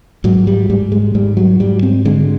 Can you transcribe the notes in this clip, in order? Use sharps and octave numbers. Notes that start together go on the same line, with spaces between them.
G#2 F#3
G3
G#2 G3
G#3
G#2 G3
F#3
G#2 G3
C4
D3 G#3